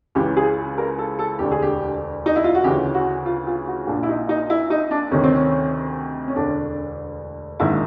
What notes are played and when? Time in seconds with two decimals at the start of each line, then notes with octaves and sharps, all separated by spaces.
0.15 C#2 C#3 E3 G4
0.37 G#4
0.78 A#4
0.98 A4
1.19 A4
1.39 E1 D2 D3 G4
1.52 G#4
1.62 G4
2.26 D#4
2.36 E4
2.44 F4
2.55 F#4
2.63 D2 C#3 E3 G4
2.94 F#4
3.26 F4
3.47 F4
3.67 F#4
3.87 A#1 A#2 D4
4.03 E4
4.09 D#4
4.29 D#4
4.50 E4
4.70 D#4
4.91 D4
5.11 D2 C3 D#3 C#4
5.24 C4
5.35 C#4
6.28 C#4
6.36 E1 D2 D3 D4
7.60 A#1 G#2 D#3 E4